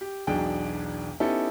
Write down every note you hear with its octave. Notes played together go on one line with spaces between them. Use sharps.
G4
E1 B1 D4 G#4 G5
B3 C#4 D#4 E4 G4 A4